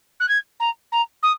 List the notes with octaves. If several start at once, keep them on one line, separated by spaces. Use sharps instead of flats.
F#6
G#6
A#5
A#5
D#6